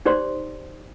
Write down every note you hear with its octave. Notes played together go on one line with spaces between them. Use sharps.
D#4 G4 C5 D5 C6